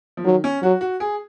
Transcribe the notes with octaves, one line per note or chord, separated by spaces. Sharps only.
F3
D#3 F#3
C#4
F#3 F#4
F#4
G#4